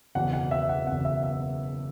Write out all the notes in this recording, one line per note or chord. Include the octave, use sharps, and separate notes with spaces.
F#1 E2 B2 F#5
F#5
E5
F#5
F#1 E2 B2 F#5
E5
E5